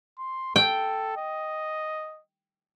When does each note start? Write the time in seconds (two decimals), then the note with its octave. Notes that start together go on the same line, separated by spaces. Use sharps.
0.19 C6
0.56 A4 G5
1.17 D#5